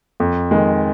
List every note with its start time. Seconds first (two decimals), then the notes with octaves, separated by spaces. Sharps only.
0.20 F2
0.51 D#3 G#3